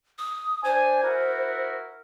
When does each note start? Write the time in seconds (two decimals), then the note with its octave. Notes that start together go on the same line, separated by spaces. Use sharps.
0.18 D#6
0.64 D4 C5 G#5
1.03 E4 F#4 A#4